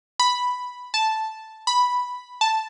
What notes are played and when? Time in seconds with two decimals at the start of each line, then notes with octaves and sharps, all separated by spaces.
0.20 B5
0.94 A5
1.67 B5
2.41 A5